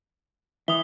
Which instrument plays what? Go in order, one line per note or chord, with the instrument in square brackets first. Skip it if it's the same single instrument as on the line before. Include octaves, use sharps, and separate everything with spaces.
[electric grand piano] E3 [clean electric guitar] E5 [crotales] D#6 G7